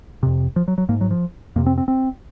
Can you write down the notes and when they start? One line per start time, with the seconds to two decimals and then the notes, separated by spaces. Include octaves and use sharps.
0.23 F2 C3
0.56 F3
0.68 F#3
0.78 F#3
0.89 G#2 A#3
1.01 F#3
1.11 F3
1.56 F2 C3 A#3
1.66 C4
1.78 C4
1.88 C4